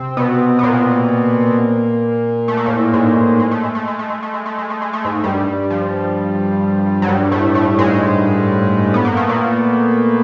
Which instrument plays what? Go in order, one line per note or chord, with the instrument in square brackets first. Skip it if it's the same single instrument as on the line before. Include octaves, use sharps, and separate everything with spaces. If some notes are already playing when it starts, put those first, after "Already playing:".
Already playing: [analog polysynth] C3 C4
B2 B3
B3
A#2 A#3
A3
A#3
A2 A3
G#2 G#3
G#3
A3
G#3
A3
G#3
A3
G#3
A3
G#3
A3
G#3
A3
G#3
A3
G#2 G#3
G2 G3
F3
F#3
G2 G3
A2 A3
A2 A3
G#2 G#3
B3
A#3
A3
A#2 A#3